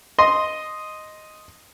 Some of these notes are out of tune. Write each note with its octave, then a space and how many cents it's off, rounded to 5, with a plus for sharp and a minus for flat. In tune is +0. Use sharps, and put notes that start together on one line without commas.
D#5 +0 C6 +0